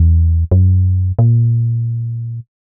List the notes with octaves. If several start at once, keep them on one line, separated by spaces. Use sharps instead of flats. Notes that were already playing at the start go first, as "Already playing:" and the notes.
Already playing: E2
F#2
A#2